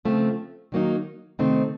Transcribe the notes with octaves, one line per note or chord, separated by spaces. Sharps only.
C#3 F3 A3 C4
D#3 F#3 A#3 D#4
C3 D#3 A3 C4 D#4